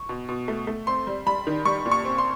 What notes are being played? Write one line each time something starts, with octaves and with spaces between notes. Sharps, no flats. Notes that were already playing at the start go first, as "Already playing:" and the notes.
Already playing: C#6
B2
B2
A3
A3
C4 C6
G3
G3 B5
D#3
G3 C#6
A#2
C#6
C4
C6